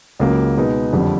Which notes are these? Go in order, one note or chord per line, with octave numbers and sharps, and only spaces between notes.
C#2 C#3 F#3 A#3
B2 G#3 B3 D#4
F#1 F2 D3 G3